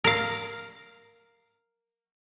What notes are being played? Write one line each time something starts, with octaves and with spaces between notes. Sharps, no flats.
A#4 F5